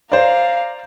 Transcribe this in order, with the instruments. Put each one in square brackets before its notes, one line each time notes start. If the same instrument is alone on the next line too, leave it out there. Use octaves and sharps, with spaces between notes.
[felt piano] C5 D5 [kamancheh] F5 A#5